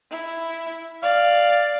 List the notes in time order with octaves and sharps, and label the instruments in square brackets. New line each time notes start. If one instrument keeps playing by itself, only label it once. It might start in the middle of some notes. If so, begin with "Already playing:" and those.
[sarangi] E4
[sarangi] D5 [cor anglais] F5